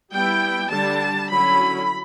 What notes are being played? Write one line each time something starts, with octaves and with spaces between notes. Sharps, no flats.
G3 B3 E4 G5
D3 G3 D4 A5
D3 F#3 C#4 E4 B5